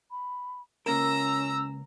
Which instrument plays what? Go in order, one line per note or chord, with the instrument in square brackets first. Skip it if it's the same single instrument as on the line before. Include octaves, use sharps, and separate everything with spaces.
[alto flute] B5
[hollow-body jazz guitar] C#2 A#3 A#4 [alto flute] C#4 [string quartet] A#5 [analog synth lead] E6